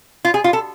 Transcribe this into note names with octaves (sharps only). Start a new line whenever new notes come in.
F4
G#4
F4
A4